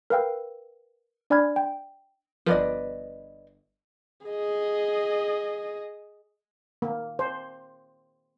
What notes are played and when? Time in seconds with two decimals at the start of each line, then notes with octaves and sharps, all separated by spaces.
0.10 A#4 B4 F5 G5 E6
1.30 D4 D5 G#5 B5 F6 G#6
1.56 G5
2.46 G1 F3 B4 D5 D#5
4.27 G#4 D#5
6.82 A#3
7.19 C5